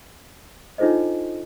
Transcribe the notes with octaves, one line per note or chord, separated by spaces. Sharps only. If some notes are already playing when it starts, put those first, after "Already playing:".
D4 D#4 F4 A4 C5 D#5